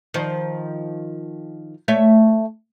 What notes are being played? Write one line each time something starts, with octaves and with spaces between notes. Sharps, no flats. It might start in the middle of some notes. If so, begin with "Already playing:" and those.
D#3 F3 C5
A3 C#5 E5